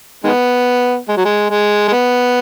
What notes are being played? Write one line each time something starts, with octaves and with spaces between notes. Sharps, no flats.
D#3 G#3 B3
G#3
F#3
G#3
G#3
G#3
B3